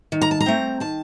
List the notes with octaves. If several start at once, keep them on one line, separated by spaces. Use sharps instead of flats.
D#3
A#5
A5
A#5
A3 C4
D#3 A5